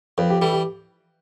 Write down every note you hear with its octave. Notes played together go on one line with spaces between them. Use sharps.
F2 B4
G4
E3 G3 A4
G4